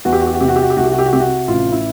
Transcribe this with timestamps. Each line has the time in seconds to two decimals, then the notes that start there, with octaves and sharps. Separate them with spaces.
0.05 E2 F#4
0.13 G4
0.20 F#4
0.27 G4
0.34 F#4
0.41 C3 G4
0.48 F#4
0.56 G4
0.62 F#4
0.70 G4
0.77 C2 F#4
0.84 G4
0.92 F#4
0.99 G4
1.06 F#4
1.13 C3 G4
1.20 F#4
1.48 A1 F4
1.72 E4